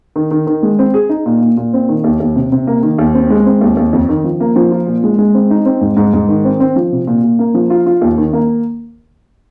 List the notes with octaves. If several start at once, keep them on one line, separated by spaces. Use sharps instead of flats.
D#3
D#3
D#3
G#3
C4
G#4
D#4
A#2
A#2
A#2
C4
D#3
D#2
D#2
C3
C3
A#3
D#3
D#2
C4
G#3
C4
D#2
D#2
F2
D#3
F3
A#3
F3
F4
A#2
G#3
G#3
C4
D#4
C4
G#2
G#2
G#2
D#3
C4
C4
F3
C3
A#2
A#2
A#3
F3
F4
F4
D#2
D#3
A#3